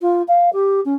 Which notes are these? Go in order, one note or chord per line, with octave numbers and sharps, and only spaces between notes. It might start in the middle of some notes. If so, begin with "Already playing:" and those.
F4
F5
G4
C#4